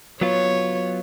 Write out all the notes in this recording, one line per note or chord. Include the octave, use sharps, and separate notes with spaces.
F#3 B3 F4 C#5